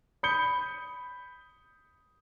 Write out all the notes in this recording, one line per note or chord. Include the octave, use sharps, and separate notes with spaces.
B5 D#6 G6 C#7 G7